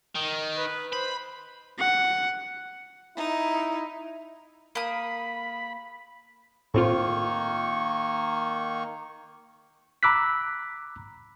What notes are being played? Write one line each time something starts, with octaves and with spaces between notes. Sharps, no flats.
D#3
B4
C5 B5
F#5
D#4 E4
A#3 B5 D#6
A2 D#3 A#3 C4 F4 C#6
A#5 B5 D6 E6 F#6 B6